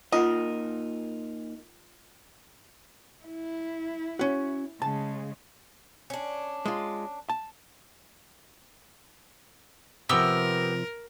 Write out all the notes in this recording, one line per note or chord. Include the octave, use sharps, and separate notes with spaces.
A#2 D#4 F4 A#4 D#5 F#5
E4
C#4 F#4
C#3 G#3 A5
C#4 D4
G#3 F4
A5
C3 F3 B3 G4 A#4 E6